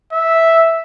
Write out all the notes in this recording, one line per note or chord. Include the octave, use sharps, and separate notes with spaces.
E5